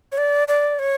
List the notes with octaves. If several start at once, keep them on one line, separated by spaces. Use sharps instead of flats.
C#5
D5
D5
C#5